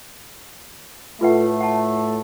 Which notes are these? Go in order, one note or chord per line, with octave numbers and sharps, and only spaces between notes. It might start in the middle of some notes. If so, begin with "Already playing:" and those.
A2 A3 F4 B4 F#5
F#5 A5